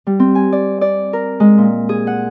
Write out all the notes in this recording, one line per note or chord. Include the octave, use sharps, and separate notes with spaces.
G3
C4
G#5
D5
D5
A#4
G#3
A#2
G#4
F#5